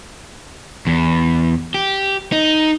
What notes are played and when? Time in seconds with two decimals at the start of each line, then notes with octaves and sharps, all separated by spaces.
0.87 E2
1.74 G4
2.32 D#4